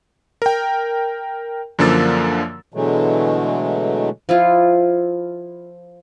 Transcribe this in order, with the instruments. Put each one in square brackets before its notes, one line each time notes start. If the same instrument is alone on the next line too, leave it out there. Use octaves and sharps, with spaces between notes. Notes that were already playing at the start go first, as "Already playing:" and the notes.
[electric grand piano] A#4 G5
F#2 D3 F3 A#3 E6 A6
[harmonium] B2 D3 E3 F#3 G#3 A3
[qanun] F3 E4 F4